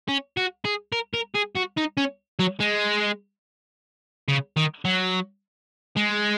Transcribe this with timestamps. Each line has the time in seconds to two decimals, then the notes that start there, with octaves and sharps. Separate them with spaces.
0.09 C#4
0.37 F#4
0.65 G#4
0.93 A#4
1.14 A#4
1.35 G#4
1.55 F#4
1.77 D#4
1.97 C#4
2.39 F#3
2.60 G#3
4.28 C#3
4.57 D#3
4.85 F#3
5.97 G#3